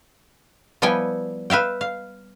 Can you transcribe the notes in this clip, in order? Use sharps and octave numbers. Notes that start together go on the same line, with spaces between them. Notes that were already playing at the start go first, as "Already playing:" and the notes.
F3 G3 B3 E4 G5 G#5
B4 E5 F5 G5
F5